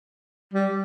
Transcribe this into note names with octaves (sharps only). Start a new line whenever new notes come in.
G3